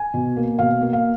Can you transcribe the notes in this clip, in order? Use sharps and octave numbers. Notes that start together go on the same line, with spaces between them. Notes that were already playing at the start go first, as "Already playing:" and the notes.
Already playing: G#5
B2
A#3
B2 F5
A#3
F5